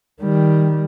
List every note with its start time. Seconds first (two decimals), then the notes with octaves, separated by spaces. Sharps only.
0.22 D#3 G3